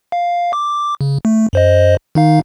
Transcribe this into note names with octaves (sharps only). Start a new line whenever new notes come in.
F5
D6
C#3
A3
F#2 C5 D#5
D#3 D#4 F5